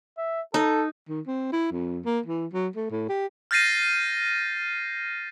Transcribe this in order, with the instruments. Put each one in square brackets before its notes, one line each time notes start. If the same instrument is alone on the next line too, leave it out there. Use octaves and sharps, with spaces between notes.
[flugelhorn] E5
[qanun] D#4 [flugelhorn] A4
[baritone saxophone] D#3
C4
E4
F2
A#3
E3
F#3
A3
A2
G4
[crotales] F6 G6 A6 A#6 C7 D#7